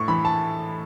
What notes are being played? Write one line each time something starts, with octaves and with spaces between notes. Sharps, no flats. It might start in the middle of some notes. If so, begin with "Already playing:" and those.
Already playing: A2 C#6
E3 B5
A5